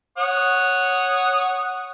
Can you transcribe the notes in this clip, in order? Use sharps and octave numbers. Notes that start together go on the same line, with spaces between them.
C#5 F#5 D#6